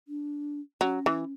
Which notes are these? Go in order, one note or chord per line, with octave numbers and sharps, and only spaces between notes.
D4
F#3 C#4
E3